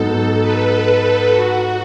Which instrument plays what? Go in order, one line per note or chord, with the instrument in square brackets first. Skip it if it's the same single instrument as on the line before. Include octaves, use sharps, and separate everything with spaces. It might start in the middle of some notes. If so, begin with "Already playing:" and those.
Already playing: [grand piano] G#2 F#3 B3 D#4 [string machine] A4
[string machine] B4
B4
A4
F#4